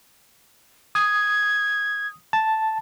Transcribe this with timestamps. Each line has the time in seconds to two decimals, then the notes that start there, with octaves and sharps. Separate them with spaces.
0.95 D#6 G#6
2.33 A5